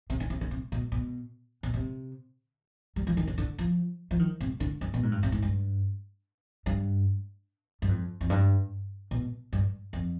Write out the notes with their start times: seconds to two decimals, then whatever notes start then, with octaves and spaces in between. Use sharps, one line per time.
0.10 C3
0.20 D3
0.30 C3
0.41 D3
0.51 C3
0.72 B2
0.92 B2
1.63 B2
1.74 C3
2.96 G3
3.07 F3
3.17 D#3
3.27 D3
3.38 D3
3.59 F3
4.11 F3
4.19 D#3
4.41 C3
4.60 D3
4.81 G2
4.94 B2
5.03 G#2
5.12 G2
5.23 C3
5.32 G#2
5.43 G2
6.66 G2
7.82 G2
7.89 F2
8.21 F2
8.30 G2
9.11 B2
9.53 G2
9.93 F2